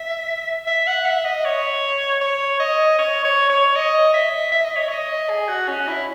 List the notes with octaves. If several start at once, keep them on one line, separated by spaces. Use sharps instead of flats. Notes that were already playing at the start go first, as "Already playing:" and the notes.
Already playing: E5
E5
F#5
E5
D#5
C#5
C#5
D#5
C#5
C#5
C#5
D#5
E5
E5
D#5
C#5
D#5
G#4
F#4
C#4
E4